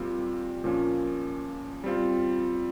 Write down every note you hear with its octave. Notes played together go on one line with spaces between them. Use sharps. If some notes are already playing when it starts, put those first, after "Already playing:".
Already playing: A#2 G3 C4 F4
A#2 F3 A#3 C#4
G3 C4 F4